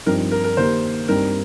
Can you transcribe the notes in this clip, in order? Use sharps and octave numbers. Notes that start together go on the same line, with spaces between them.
G2 F3 C4 D#4 A#4
A#4
A#4
D#3 A#3 G4 A#4 C5
G2 G3 C4 D#4 A#4